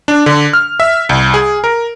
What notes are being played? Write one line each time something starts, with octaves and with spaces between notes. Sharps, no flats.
D4
D3
F6
E5
C2
G#4
A#4